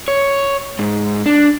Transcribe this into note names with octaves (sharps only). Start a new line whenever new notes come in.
C#5
G#2
D4